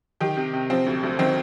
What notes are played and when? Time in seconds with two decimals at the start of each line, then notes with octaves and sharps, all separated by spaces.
0.21 D#3 G4
0.37 C3
0.54 C3
0.70 F3 C4
0.87 D2
1.03 D2
1.19 D#3 C4